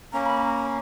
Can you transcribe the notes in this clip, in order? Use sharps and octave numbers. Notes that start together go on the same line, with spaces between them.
A#3 C#4 A#5
B5
A#5